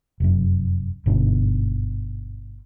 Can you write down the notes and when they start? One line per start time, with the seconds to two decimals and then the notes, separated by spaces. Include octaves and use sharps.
0.20 F1 F#2
1.06 G1 G#2 B2 D3